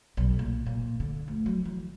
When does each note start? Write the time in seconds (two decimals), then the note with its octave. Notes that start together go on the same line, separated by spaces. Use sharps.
0.17 B1
0.39 A#2
0.66 A#2
1.00 D3
1.28 D2
1.46 F#3
1.65 E3